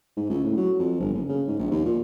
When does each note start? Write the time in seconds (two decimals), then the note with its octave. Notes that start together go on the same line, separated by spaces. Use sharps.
0.17 G#2
0.30 C#2
0.44 A2
0.57 F#3
0.79 F2
1.00 G1
1.13 F#1
1.29 C#3
1.48 G#2
1.59 A#1
1.71 D#2
1.86 A#2